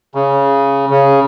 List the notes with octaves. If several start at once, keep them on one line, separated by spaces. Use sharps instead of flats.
C#3
C#3